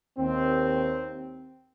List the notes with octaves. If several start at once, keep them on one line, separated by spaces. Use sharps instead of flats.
D#2 C4